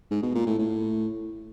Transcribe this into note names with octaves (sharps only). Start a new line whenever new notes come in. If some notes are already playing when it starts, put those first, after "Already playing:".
G#2
B2
A#2
A2
A2